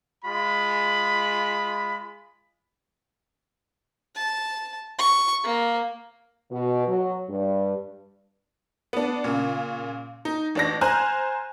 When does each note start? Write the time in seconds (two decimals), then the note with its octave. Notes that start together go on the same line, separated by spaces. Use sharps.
0.24 G#3 F4 B5
4.15 A5
4.99 C#6
5.44 A#3
6.51 B2
6.87 F#3
7.29 G2
8.93 B3 D4
9.24 A#2 C#3
10.25 D#4
10.55 A1 D4 A#6
10.81 C5 G#5 A#5 F6 F#6